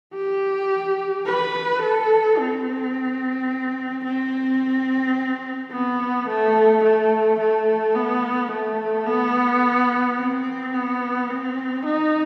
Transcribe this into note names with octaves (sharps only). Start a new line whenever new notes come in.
G4
B4
A4
C4
C4
B3
A3
A3
A3
B3
A3
B3
C4
B3
C4
D#4